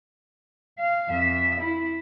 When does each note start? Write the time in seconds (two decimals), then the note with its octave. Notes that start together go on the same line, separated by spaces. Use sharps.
0.78 F5
1.09 F2 E5
1.60 E4